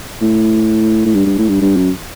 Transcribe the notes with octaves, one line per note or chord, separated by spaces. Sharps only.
A2
A2
G2
G2
A2
G2
G2
F#2